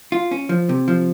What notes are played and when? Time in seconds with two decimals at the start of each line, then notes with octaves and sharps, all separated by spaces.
0.12 F4
0.31 C#4
0.49 F3
0.69 C3
0.88 F3